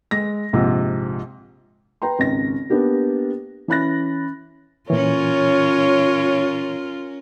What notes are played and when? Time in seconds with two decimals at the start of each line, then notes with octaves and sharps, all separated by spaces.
0.11 G#3 A#6
0.53 A#1 G#2 C3 F3
2.02 B4 G5 A#5 C6
2.19 G#1 C#2 A#6
2.69 A#3 B3 D4 G4 A#4
3.68 E3 C#4 B5 F#6 A6 A#6
4.90 A#2 E3 C#4 F4 A#4 C#5